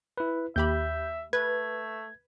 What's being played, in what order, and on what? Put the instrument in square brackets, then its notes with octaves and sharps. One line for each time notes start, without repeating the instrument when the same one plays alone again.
[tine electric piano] E4 B4
[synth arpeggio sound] D#2 G4 B5 [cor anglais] E5 [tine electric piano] G6
[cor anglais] A3 [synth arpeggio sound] B4 [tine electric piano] G#6